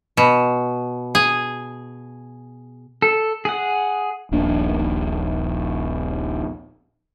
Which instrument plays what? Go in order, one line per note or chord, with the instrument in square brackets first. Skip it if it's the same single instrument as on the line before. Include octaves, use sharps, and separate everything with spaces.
[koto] B2
G#4
[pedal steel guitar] A4
G#4 F#5
[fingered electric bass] D#1 A#1 A#3 D4